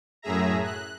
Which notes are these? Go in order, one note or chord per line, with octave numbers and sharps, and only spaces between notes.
F#2 A2 G#4 E5 A#5
F#6